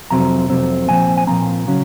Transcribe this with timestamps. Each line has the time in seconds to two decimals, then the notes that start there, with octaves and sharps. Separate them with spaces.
0.10 F2 C3 F#3 C4 A#5
0.50 F2 C3 F#3 C4
0.88 A#2 F3 C4 G#5
1.18 G#5
1.27 A#2 F3 C4 A#5
1.68 C#3 F#3 C#4